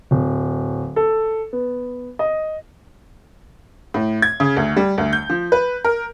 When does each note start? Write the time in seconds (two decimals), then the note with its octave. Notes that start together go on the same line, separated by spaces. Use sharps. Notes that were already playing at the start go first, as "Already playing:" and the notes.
0.11 D1
0.96 A4
1.53 B3
2.19 D#5
3.94 A2
4.22 G#6
4.40 C#3
4.57 D2
4.77 G3
4.98 D2
5.13 G6
5.30 F3
5.52 B4
5.85 A#4